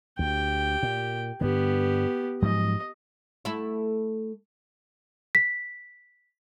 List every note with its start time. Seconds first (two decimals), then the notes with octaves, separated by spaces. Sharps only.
0.19 D2 G4 G5
0.83 A#2
1.41 G2 D3 B3 G4
2.42 G#2 F3 F#3 D#5
3.45 A3 E4
5.35 B6